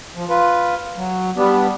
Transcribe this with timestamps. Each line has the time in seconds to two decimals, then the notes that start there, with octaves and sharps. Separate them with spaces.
0.16 F3
0.29 F4 B4
0.97 F#3
1.37 G3 B3 D4